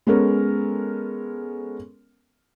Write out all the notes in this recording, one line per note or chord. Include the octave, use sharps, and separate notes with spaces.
G#3 B3 C#4 A4 A#4